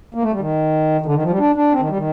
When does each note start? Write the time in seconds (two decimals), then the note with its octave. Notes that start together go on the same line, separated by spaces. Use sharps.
0.15 A#3
0.23 A3
0.32 G3
0.39 D#3
1.01 D#3
1.06 D3
1.15 D#3
1.23 F3
1.30 G3
1.39 D4
1.55 D4
1.72 C4
1.80 D#3
1.89 G3
1.97 D#3